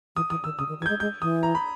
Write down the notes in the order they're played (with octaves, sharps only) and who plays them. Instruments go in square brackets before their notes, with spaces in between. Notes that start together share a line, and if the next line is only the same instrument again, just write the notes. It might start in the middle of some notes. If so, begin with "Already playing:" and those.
[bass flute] E3 [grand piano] D#6
[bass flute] E3 [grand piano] D#6
[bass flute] D#3 [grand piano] E6
[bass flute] C#3 [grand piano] D#6
[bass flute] D#3
[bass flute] E3 [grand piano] G#6
[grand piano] G6
[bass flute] G#3
[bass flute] G#3 [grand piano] G6
[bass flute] E3 [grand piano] D#6
[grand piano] A#5
B5